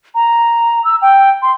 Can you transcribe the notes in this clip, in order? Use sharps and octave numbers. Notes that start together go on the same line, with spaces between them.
A#5
E6
G5
C6